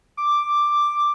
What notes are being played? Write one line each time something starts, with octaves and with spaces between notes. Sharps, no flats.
D6